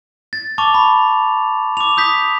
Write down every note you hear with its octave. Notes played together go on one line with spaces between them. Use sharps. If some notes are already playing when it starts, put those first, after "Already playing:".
A6
A5 C#6 D6 F7
B5
D6 F7
D#6 G6 B6